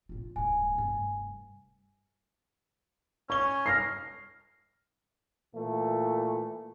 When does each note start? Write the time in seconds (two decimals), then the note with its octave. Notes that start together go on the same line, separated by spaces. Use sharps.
0.09 A2 F4
0.36 D1 G2 G#5
0.75 F1 G2
3.30 C#4 C#6 G7
3.66 F6 A#6 C7
5.54 A#2 E3 A3